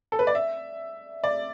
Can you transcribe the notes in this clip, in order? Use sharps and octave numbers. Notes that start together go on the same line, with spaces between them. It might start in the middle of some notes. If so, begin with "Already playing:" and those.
A4
B4
D5
E5
D5